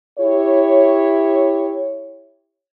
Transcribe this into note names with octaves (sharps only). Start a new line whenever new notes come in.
E4 G4 C#5